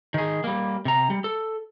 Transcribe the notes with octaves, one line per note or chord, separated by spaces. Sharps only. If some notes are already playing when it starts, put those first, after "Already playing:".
D#3 G#4
G3 A#3
C3 A#5
G3
A4